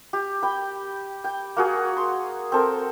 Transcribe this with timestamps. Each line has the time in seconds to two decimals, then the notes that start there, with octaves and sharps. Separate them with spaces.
0.13 G4
0.43 G5 B5
1.24 G5
1.57 A#3 F#4 G#4
1.97 C6
2.52 C4 A4 A#4